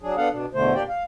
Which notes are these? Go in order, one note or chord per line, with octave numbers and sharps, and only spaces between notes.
F#3 D4 G#4
B3 D4 A4 F5 F#5
B2 D4
E2 B2 D3 A3 C5
A#2 A#3 D4 G4 D5 G5
F5